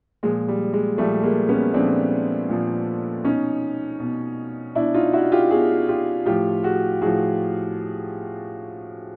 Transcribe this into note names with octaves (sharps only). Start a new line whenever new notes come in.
A#2 F3 G#3
G3
G#3
A#2 F3 G3 A3
G#3 A#3
B3 C#4
A#2 F3 C4 D4
A#2 F3
B2 C#4 D#4
B2
B2 D4 E4
D#4 F4
E4 F#4
F4 G4
B2 F#4 G#4
F4 G4
A2 F3 F4 G4
F#4 G#4
A2 F3 F#4 G#4